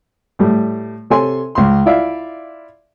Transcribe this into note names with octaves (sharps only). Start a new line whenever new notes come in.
A2 G3 A3
C3 A4 C#5 G#5 C6
C#2 C6
E4 F4 D5 E5 F5